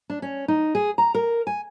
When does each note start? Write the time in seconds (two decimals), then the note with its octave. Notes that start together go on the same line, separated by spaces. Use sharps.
0.10 D4
0.22 C#4
0.48 D#4
0.75 G#4
0.98 A#5
1.15 A#4
1.47 G#5